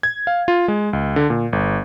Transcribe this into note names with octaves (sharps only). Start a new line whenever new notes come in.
G#6
F5
F4
G#3
C#2
D3
A#2
G1